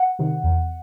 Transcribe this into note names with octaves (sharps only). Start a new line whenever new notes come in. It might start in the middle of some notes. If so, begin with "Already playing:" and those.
Already playing: F#5
C3 D#3
E2